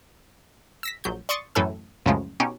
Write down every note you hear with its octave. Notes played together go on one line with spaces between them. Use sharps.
E6 A#6 B6
A#1 F#3 G6
D5 C6 C#6 D#6 A6
F#2 A2 E3 A4 G#5 E6
C#2 F#2 A2 C#3 F3 G#3
B2 C#4 D#4 G4